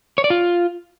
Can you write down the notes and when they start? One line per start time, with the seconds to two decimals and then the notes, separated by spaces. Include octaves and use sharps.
0.18 C#5
0.24 D5
0.30 F4